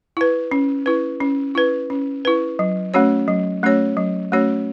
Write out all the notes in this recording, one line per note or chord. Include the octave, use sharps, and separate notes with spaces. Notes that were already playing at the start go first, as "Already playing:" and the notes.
E4 B4
C#4
E4 B4
C#4
E4 B4
C#4
E4 B4
F#3
A3 C#4 F#4 C#5
F#3
A3 C#4 F#4 C#5
F#3
A3 C#4 F#4 C#5